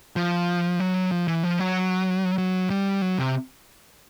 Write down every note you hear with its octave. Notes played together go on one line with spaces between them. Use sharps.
F3
F#3
F3
E3
F3
F#3
F#3
G3
F#3
C3